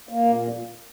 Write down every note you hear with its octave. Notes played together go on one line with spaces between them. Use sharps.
A#3
A#2